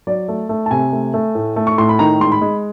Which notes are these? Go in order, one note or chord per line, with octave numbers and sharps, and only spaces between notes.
F#3 D5
A3
A3
A5
C3 G#5
A3
A3
A2
A3
C#6
A2 C6
B5
D#3 A#5
G#3 C6
B5
G#3